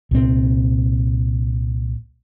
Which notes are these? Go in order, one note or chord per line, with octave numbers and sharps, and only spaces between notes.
C2 A#2 C4